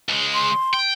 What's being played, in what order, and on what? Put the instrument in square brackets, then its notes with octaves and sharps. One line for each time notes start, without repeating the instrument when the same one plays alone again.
[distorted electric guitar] C#2 G#3
[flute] C6
[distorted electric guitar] G5